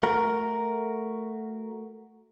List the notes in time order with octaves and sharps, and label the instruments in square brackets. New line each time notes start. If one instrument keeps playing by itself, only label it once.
[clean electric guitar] A3 F#4 A#4